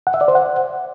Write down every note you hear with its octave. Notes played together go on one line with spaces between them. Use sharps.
F#5
E5
D5
C5
F#5